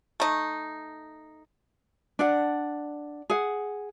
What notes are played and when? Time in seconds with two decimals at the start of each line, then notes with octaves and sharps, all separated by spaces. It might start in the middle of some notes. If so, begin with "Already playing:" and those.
0.20 A3 D#4
2.19 D4 D5 F#5
3.30 G#4 F#5